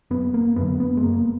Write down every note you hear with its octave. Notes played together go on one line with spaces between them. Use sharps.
F#1 B3
A#3
F#2 D3 B3
B3
G#3
F#1 A#3